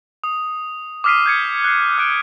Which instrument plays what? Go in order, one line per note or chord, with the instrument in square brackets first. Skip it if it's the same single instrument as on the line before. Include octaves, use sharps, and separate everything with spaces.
[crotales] D#6
D6 D#6 F6 B6 C7 D#7
G6 G#6 C#7
F#6 C7
F6 F#6 D7 D#7